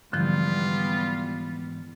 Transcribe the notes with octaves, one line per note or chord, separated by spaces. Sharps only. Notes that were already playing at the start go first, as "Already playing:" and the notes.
G#2 D3 E3 F3 G3 B3 F4 G6